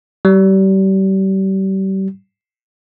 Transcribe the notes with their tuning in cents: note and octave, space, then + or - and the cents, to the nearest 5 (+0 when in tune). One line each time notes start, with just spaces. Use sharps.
G3 -35